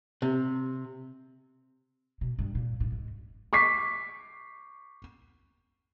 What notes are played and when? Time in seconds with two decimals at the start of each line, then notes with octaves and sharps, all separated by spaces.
0.22 C3
2.21 B2
2.39 G2
2.55 A#2
2.80 G#2
2.92 G#2
3.53 C#6 D6 B6 C7